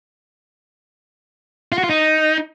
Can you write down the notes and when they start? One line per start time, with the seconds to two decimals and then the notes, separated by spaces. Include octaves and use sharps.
1.72 F4
1.78 F#4
1.84 F4
1.90 D#4